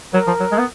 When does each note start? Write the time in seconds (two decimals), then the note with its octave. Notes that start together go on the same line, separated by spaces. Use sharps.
0.14 F#3 A#4
0.27 F3
0.40 F#3
0.52 G#3
0.59 B3